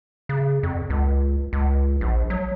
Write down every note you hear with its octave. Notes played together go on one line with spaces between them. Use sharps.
C#3
F2
C#2
C#2
A#1
F#3